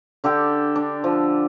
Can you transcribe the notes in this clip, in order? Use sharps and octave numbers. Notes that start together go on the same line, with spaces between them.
D3 G4 A4 G5
D4
F3